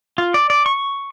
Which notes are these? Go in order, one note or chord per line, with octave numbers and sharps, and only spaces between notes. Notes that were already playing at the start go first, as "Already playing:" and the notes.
F4
D5
D5
C#6